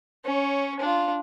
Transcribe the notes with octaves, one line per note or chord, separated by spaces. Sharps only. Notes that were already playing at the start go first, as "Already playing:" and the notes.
C#4 C#5
D4 F4